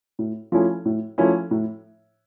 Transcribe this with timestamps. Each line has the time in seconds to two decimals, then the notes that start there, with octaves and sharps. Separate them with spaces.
0.19 A2
0.52 F3 A3 C#4 E4
0.85 A2
1.18 F3 A3 C#4 E4
1.51 A2